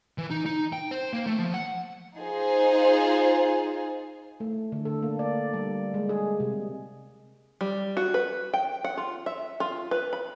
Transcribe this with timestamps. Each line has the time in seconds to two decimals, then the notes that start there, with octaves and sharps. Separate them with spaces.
0.18 E3
0.30 D#4
0.46 D#4
0.73 G5
0.91 C5
1.13 A#3
1.27 A3
1.39 F3
1.54 F#5
2.17 D#4 F4 G#4 C5
4.40 A3
4.72 D3
4.85 A4
5.03 A#3
5.19 D5
5.54 G3
5.94 G#3
6.09 G#4
6.40 C3
7.61 G3
7.97 F#4
8.14 B4
8.54 G5
8.84 F#5
8.98 F4
9.26 E5
9.60 F4
9.91 B4
10.13 B5